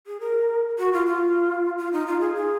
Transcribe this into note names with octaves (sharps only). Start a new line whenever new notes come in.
G#4
A#4
F#4
F4
F4
F4
D#4
F4
G#4
G#4